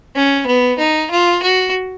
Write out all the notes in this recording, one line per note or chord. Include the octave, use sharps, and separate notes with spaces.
C#4
B3
D#4
F4
F#4